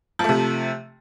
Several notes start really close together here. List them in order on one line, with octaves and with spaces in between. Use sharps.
F3 A3 C3